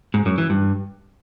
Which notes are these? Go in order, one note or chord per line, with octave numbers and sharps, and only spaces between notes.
G#2
F#2
E3
G2